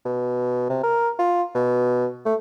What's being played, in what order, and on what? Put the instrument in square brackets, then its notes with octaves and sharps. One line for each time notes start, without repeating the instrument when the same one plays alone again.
[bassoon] B2
C3
A#4
F4
B2
A3